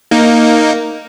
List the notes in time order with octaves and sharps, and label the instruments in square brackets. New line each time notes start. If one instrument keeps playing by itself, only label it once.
[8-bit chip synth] A#3 D#4